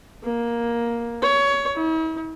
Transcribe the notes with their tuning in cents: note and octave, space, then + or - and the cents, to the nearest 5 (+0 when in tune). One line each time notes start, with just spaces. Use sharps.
A#3 +10
C#5 +20
E4 -45